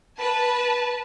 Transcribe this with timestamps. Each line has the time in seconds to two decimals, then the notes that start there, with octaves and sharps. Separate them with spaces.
0.18 B4 A5